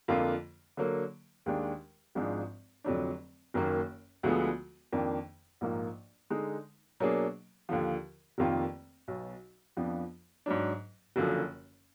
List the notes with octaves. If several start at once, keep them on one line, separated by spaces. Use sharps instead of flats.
F2 D3 F3 A#3 F4
D3 F#3 A#3
D#2 D#3 G#3 D4
G#1 G#2 F3 G#3 D4
F1 F2 D3 F#3 D4
F#1 F#2 D#3 A#3
D2 D3 F3 G#3 B3
F2 D#3 A#3 D4
A#1 G#2 F3 A#3
D3 G#3 D#4
B2 F#3 A#3 D4 G#4
D#2 D3 F3
F1 F2 D#3 A#3 F4
B1 B2 F#3
F2 F3 B3 D4
G#2 F#3 D4
F#1 F#2 D3 F3